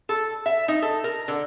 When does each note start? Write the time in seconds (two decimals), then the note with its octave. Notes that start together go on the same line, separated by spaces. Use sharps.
0.09 A4
0.46 E5
0.68 D#4
0.82 A4
1.04 A#4
1.28 D3